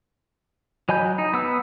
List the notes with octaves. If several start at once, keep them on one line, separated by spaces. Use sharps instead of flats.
F#3 D#5 G#5 B5 G6
D#4
B3 E6